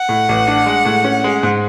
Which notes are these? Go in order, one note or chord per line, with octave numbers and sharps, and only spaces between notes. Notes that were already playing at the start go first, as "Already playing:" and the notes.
Already playing: F#5
A2
A1
D4
G#3
A2
C#4
G#3
G#2